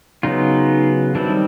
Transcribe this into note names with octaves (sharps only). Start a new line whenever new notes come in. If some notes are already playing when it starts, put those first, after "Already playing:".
C#3 F#3 B3 D#4 F4
D#3 G3 C4 D4 E4